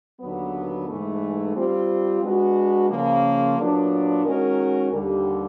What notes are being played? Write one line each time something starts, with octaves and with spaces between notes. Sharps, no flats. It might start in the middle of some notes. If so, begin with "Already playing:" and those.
D#2 D3 F#3 B3
G#2 E3 A3
G3 C4 F4
G#3 B3 D4 F#4
C#3 F3 A#3
A#2 F#3 B3 D4
D#3 G#3 C#4 F#4 A#4
D#2 D3 G3